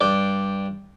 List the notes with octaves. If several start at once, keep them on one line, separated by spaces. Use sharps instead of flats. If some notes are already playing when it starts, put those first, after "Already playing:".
G2 D5 G5